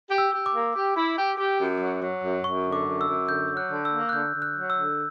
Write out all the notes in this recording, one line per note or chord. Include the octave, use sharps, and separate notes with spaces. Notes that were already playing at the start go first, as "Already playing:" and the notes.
G4
E6
G4
D6
A#3
G4
E4
G4
G4
F#2
F#3
F#3
F#2
F#2 C#6
D3
D6
F#2
E6
F#2
D3 G6
F#3
F#6
D3
E6
A#3
F#6
D3 G6
D3
F#6
F#3
E6
D3